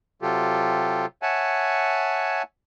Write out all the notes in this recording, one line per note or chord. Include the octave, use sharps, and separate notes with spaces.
C3 F#3 F4 G4 A4
C#5 E5 F#5 G#5 A5